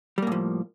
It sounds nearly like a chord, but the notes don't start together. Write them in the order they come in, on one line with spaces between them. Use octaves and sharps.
G3 A#3 A2 F3